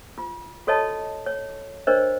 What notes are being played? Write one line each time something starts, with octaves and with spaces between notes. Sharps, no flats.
F4
F#4 A4 C#5 D#5 A5
C#5
D4 A#4 C5 C#5 D#5